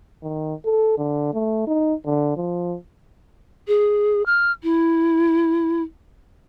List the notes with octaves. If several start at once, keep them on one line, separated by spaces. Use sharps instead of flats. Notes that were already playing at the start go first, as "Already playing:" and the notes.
D#3
A4
D3
A3
D#4
D3
F3
G#4
F6
E4